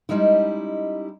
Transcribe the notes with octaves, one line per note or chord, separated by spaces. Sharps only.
G3 G#3 C#4 D#4 E4